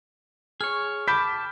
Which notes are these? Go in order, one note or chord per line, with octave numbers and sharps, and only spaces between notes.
G#4 C#5 F6
G5 A5 B5 D6 G6 B6